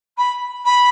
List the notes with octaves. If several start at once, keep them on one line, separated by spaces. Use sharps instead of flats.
B5
B5